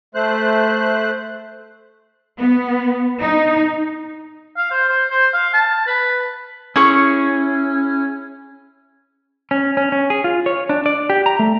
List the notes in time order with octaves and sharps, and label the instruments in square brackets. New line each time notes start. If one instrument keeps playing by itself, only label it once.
[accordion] A3 C5 F#6
[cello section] B3
D#4
[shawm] F5
C5
C5
C5
F5
A5
B4
[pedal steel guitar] C#4 [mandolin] E4 G#4 C#6
[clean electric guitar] C#4
C#4
C#4
G#4
F4
C#5
D4
D5
G4
A#5
A3